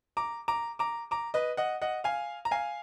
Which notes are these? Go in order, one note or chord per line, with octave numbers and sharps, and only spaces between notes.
A#5 D6
A#5 D6
A#5 D6
A#5 D6
B4 D#5
D#5 F#5
D#5 F#5
F5 G#5
A#5
F5 G#5